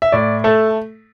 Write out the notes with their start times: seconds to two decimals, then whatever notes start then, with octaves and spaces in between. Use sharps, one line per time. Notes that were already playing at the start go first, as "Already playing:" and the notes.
0.02 E5
0.12 A2 D5
0.44 A3 A4